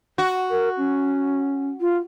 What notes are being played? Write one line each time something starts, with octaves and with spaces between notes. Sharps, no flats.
F#4
A#4
C#4
F4